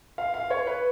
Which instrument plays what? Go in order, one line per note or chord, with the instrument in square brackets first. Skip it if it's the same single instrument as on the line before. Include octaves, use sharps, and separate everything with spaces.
[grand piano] F5
F5
C#5
B4